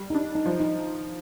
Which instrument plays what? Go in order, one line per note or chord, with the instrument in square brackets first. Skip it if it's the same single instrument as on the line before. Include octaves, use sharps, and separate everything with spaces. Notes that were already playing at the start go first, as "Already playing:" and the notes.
Already playing: [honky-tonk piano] G3
[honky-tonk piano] D4 [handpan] D#4
[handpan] D#4
[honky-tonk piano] F3
[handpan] D#4